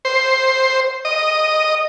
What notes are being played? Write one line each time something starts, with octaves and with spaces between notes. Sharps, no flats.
C5
D#5